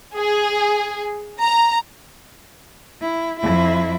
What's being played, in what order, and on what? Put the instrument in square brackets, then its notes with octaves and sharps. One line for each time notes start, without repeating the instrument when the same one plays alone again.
[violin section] G#4
A#5
[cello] E4
F2 E4